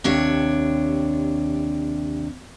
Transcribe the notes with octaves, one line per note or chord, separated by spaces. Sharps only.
D#2 C3 D4 C#5